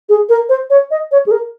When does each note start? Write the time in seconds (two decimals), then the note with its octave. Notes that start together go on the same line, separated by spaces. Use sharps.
0.09 G#4
0.29 A#4
0.49 C5
0.70 C#5
0.91 D#5
1.11 C#5
1.26 G#4
1.31 A#4